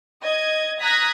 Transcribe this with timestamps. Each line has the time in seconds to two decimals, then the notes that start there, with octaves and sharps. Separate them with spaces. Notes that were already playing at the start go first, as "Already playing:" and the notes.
0.23 D#5 G#6
0.80 A#5 D#6 F#6 G#6 A#6 B6